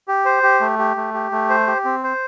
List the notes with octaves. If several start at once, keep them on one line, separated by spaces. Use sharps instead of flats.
G4
C5
G4
A3
G4
A3
G4
A3
C5
G4
C4
C5